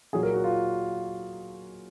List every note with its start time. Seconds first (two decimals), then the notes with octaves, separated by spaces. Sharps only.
0.13 A#2 F#3 G#4
0.23 A#4
0.34 F#4
0.44 F4